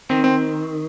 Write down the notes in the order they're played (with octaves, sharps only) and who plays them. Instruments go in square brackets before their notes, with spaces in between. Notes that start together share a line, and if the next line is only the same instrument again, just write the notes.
[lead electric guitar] D#3 [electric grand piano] C4
[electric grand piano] C4